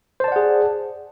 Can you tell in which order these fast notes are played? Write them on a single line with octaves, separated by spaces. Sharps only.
C5 A5 D5 F#5 G#4